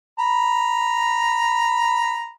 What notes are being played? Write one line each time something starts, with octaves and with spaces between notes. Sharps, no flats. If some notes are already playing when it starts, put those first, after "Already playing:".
A#5 B5